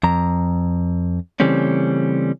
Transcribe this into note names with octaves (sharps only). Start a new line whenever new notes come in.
F2 A#5
C#3 E3 G3 A3 C4 C#4